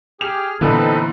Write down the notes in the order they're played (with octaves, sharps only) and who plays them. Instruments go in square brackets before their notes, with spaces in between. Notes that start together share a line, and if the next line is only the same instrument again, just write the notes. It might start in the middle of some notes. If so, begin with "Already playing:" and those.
[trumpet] G4 [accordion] G#4 F6 [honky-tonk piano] F7
[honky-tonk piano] A#2 D3 B3 [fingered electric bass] E3 [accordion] C4 D#4 B4 [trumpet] A4